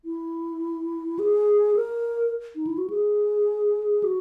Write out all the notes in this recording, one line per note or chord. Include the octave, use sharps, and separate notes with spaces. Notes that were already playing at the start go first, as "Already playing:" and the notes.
E4
G#4
A#4
D#4
E4
F#4
G#4
F#4